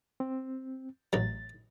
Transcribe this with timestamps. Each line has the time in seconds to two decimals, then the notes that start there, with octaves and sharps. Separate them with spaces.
0.20 C4
1.13 A1 F#3 A6